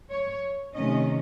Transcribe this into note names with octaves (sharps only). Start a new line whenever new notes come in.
C#5
C3 D#3 A3 C#4 D#5